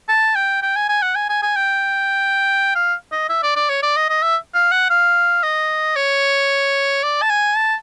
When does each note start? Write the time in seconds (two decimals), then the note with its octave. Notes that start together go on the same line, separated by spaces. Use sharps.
0.09 A5
0.35 G5
0.62 G5
0.76 G#5
0.89 G#5
1.02 F#5
1.16 G#5
1.30 G#5
1.42 G#5
1.56 G5
2.75 F5
3.12 D#5
3.29 E5
3.43 D5
3.56 D5
3.70 C#5
3.83 D5
3.96 D#5
4.10 D#5
4.22 E5
4.54 F5
4.72 F#5
4.90 F5
5.43 D#5
5.96 C#5
7.03 D5
7.22 A5
7.30 G#5
7.57 A5